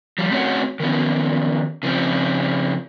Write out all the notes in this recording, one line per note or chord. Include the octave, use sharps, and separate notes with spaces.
F3 G3
A3 C4 C#4 F#4 C#5 F#5
D#3 F3 B3 C#4
C#3 F3 C4